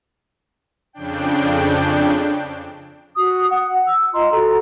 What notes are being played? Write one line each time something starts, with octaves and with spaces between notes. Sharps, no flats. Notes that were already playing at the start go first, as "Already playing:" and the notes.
F2 C#3 D4 G5
F#4 D#6
F#5
E6
F4 D#5 A#5 C6
F#4 A4 A#5